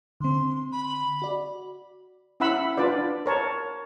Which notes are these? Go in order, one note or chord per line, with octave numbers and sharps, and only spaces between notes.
D3 C4 C6
B5
F#4 D5
C#4 E4 E5 F#5 B5 E6
D4 F4 B4 D5
A#4 C#5 A5